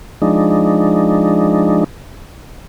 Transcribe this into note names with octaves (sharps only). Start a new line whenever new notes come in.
F3 G#3 D4 D#4